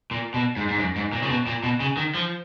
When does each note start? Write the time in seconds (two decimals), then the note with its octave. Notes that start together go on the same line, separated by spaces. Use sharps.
0.11 A#2
0.34 B2
0.57 G#2
0.68 G#2
0.79 F#2
0.96 G#2
1.12 A#2
1.23 C#3
1.30 B2
1.47 A#2
1.64 B2
1.80 C#3
1.97 D#3
2.15 F3